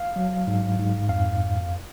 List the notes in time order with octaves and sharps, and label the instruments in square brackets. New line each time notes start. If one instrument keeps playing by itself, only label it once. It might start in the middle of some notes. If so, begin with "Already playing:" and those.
Already playing: [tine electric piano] F5
F#3
G#2
G#2
F2 F5